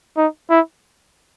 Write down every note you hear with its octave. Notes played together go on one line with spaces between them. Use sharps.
D#4
E4